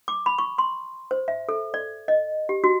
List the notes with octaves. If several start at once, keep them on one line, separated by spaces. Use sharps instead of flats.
D6
B5
C#6
C6
C5
E5
A4
D5
D#5
G4
F#4